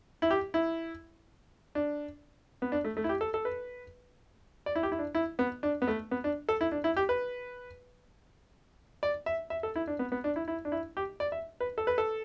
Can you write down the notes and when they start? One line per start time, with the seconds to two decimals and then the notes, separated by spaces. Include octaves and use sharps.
0.22 E4
0.31 G4
0.54 E4
1.75 D4
2.62 B3
2.72 D4
2.84 A3
2.97 A3
3.04 E4
3.09 G4
3.21 A4
3.34 A4
3.45 B4
4.66 D5
4.75 E4
4.83 G4
4.92 E4
4.99 D4
5.15 E4
5.39 B3
5.63 D4
5.82 B3
5.88 A3
6.11 B3
6.24 D4
6.49 A4
6.61 E4
6.72 D4
6.84 E4
6.97 G4
7.09 B4
9.03 D5
9.26 E5
9.50 E5
9.63 A4
9.76 E4
9.87 D4
9.99 B3
10.12 B3
10.24 D4
10.36 E4
10.48 E4
10.65 D4
10.72 E4
10.97 G4
11.20 D5
11.32 E5
11.61 B4
11.78 A4
11.87 B4
11.98 A4